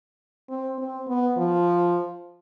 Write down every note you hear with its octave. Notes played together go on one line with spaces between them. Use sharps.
C4
C4
B3
F3